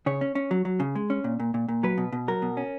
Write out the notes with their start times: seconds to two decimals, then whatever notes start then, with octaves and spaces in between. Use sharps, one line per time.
0.06 C#3 C#5
0.21 C#4
0.35 C#4
0.51 F#3
0.65 F#3
0.80 C#3
0.95 G#3
1.10 C#4
1.24 A#2
1.40 A#2
1.54 A#2
1.68 A#2
1.83 F#3 B4
1.98 B2
2.12 B2
2.28 F#3 A#4
2.42 B2
2.57 C#4